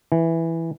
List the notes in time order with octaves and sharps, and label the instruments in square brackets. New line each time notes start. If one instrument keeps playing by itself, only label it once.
[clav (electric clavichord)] E3